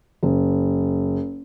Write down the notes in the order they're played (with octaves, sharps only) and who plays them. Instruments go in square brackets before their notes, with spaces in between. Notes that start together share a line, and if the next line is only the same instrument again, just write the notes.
[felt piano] F#1